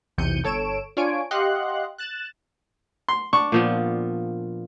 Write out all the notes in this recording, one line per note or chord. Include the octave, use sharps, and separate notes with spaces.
B1 E2 C3 G6 C#7 D#7
G1 A4 C#5 D7 E7
D4 F4 C#5 G#5 D7
G4 D#5 F5 F#5 C6 F#6
F#6 A6 E7
C6
D4 C#6
A#2 F3 B3